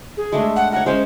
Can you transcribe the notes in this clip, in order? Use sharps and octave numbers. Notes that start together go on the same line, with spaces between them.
G#4
G#3 A3 D4
F#5
A#4 C#5 F#5
G#3 C#4 C5